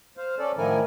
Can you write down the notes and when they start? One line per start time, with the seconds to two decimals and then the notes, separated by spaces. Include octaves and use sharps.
0.17 C5 F5
0.39 C#4 A4 D5
0.57 A2 D#3 F3 E4 A#4 G#5